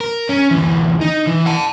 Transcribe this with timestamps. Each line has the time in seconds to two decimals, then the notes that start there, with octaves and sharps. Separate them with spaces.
0.01 A#4
0.29 C#4
0.51 D2 E3
1.01 D#4
1.27 E3
1.46 F#5 A5